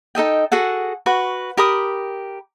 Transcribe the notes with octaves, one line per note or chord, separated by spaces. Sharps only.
D#4 A4 D#5 G5
F#4 G#4 A4 F#5
F#4 B4 C#6
G4 A#4 B5 D#6